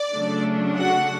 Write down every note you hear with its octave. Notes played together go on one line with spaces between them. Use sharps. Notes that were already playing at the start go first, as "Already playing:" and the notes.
Already playing: D5
C#3 F#3 A3 D4
F#4 F#5